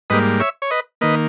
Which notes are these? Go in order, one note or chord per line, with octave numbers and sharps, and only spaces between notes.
G#2 G3 A#3 B4 D#5
C#5 E5
C#5
B4 D#5
D#3 A#3 B4 D#5